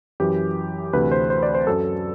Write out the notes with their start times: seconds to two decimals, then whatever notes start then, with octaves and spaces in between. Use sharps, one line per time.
0.20 F#2 E3 G4
0.93 D2 C3 E3 B4
1.12 C5
1.30 C5
1.43 D5
1.55 C5
1.67 F#2 F#3 A4